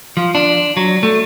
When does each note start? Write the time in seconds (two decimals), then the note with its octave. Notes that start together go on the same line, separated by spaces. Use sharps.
0.17 F3
0.35 D4
0.77 F#3
1.03 A3